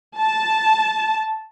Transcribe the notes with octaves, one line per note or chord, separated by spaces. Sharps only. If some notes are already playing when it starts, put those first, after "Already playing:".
A5